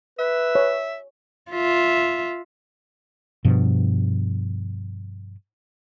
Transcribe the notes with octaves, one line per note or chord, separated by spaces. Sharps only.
B4 E5
C#5
F4 E5
G2 B2 F3